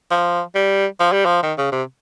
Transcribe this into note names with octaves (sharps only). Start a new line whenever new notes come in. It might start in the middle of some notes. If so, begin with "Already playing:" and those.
F3
G3
F3
G3
F3
D#3
C#3
C3